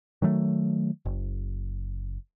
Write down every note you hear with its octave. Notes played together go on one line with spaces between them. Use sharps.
D#3 F#3 G3 A3
F#1